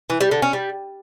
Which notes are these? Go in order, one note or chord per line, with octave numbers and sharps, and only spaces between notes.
E3
G3
D3
C#4
G3